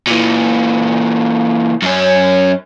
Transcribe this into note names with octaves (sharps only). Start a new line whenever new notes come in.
A#2 E3
F#2 C#4